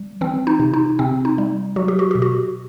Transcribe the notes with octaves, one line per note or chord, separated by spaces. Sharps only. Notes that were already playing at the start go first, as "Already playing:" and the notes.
Already playing: G3
E3 C4
D#4
C3
D#4
C3 C4
D#4
G3
F#3 F#4
G4
F#4
B2 G4
F#4